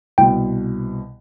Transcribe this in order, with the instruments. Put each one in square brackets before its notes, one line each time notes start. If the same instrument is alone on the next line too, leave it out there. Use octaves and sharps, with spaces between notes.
[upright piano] C2 B2 [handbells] G5